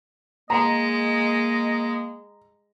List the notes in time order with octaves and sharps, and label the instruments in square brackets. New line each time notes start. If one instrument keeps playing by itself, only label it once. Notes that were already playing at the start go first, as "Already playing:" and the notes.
[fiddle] G#3 [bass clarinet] A#3 [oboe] D#5 [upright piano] A#5